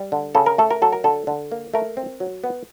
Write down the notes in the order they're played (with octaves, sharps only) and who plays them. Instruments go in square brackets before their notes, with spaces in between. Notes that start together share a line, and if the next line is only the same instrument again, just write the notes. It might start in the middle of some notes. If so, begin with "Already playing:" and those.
Already playing: [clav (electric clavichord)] G3
D3
C#3 A4
A#4
A3 A4
A#4
F#3 A4
A#4
D3 A4
D3
A#3
A3 A#4
C4
F#3
B3